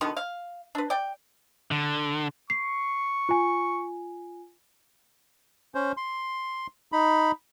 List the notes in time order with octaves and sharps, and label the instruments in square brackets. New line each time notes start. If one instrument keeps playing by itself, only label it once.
[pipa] B2 D3 D#3 B3
F5
D4 B4
D5 G5
[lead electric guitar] D3
[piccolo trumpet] C#6 [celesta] C7
[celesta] F4 G#5
[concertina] C#4 C5
C6
D#4 B5